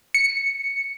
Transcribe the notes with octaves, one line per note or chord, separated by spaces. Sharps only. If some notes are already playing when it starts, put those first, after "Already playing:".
C#7